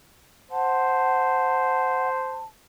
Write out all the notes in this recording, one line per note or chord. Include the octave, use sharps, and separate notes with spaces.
C5 F#5 A5